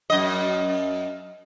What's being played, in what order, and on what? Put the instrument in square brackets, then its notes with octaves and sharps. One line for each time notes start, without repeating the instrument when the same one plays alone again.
[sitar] F#2 D#5